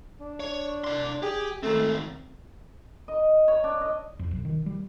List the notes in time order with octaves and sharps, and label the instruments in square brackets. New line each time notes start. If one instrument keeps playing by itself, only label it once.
[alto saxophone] D4
[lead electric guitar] C#5
D5 C6
[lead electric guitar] G4 [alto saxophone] G#4
[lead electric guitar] D#3 C4 [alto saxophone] A3
[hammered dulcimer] D#5
C#5
D4
D#5
[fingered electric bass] F2
B1
D#3
G3